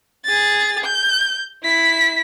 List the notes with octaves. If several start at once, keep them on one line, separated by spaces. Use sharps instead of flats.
G#4 A6
G6
E4 B6